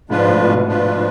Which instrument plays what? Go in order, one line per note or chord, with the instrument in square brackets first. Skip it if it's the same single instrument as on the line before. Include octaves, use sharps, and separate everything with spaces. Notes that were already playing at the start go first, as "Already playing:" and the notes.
[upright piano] G#2 [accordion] F3 G#3 D4 F4 B4
[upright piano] A2
A2
B2
[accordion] F3 G#3 D4 F4 B4